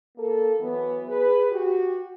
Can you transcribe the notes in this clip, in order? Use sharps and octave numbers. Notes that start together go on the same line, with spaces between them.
A#3 A4
E3 F#3 B3
G#4 B4
F#4 G4